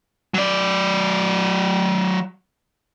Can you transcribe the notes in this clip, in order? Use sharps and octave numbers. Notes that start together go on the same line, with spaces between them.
F#3 D5